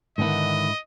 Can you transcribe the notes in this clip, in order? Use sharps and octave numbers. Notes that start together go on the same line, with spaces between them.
G#2 D3 D#3 B3 E4 D#5